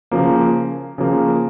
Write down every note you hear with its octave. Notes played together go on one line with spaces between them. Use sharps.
C#3 F3 A#3
C#3 F3 A#3